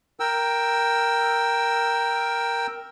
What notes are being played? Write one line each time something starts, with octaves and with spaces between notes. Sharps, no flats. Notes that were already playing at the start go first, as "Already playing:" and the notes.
A#4 G5 E6